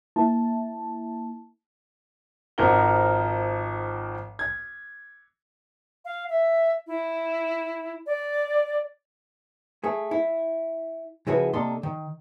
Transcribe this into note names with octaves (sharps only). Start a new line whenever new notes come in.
A#3 E4 A5
G#1 F3 D#4 A#4 F#5 G7
G#6
F5
E5
E4
D5
A3 G#4
E4
C#3 F3 E4 F#4 G#4 B4
C3 A#3 D4 A4 D#5 C6
D#3